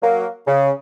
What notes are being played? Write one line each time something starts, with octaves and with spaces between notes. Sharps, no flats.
F#3 A#3
C#3